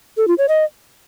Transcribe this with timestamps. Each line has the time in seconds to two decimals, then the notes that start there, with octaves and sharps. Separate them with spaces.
0.17 A4
0.28 F4
0.38 C#5
0.49 D#5